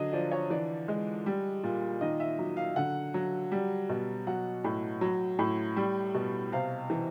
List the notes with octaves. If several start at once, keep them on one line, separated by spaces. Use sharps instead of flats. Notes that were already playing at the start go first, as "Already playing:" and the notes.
Already playing: D3 F#3 D#5
F3 D5
C#5
E3 D5
G#3
G3
A#2
D#3 D#5
E5
F#3
F5
D3 F#5
F#3
G3
B2
F#3 F#5
A2
F#3
A2
G3
B2
C3 F5
E3